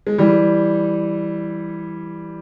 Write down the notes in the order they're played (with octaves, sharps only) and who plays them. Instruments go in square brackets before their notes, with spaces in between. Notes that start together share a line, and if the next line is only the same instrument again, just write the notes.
[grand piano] G#3
E3 G3